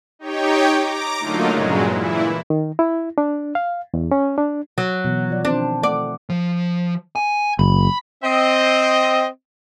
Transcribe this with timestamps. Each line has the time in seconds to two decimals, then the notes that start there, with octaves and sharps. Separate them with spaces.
0.19 D#4 G4 C#5 G5
0.74 A#5 D6
1.20 D3 F#3 A3 A#3 D#4 F4
1.48 G2 A#2 C#3 F#3 G#3
1.87 A#2 E3 E4
2.50 D#3
2.79 E4
3.18 D4
3.55 F5
3.94 E2
4.12 C#4
4.38 D4
4.78 F#3
5.04 B2 E3
5.30 F3 D5
5.45 D#3 C4 D4 C5
5.83 A3 D5 F#5
6.30 F3
7.16 G#5
7.59 F#1 B5
8.24 C4 D#5